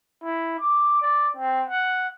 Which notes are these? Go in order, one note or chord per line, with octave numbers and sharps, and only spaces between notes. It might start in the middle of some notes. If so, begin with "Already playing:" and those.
E4
D6
D5
C4
F#5